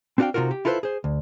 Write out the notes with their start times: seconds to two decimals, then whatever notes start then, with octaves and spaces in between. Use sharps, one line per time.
0.18 C4 D4 F#4 B4 F5 G5
0.34 C3 D#4 F4 F#4 A#4
0.51 G4
0.65 E4 F4 A4 B4 C5
0.83 G#4 C5
1.04 D2